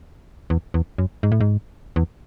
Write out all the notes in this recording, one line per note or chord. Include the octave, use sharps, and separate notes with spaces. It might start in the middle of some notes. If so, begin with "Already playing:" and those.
E2
E2
F#2
G#2
A2
G#2
E2